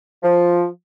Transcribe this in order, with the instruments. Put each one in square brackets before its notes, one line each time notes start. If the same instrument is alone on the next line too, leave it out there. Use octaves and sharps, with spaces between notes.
[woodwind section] F3